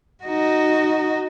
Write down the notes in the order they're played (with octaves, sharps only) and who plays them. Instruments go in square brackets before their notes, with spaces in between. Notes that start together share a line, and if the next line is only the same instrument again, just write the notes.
[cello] D#4 F#4